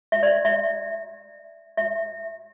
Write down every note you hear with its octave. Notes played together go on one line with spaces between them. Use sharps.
E5
D5
E5
E5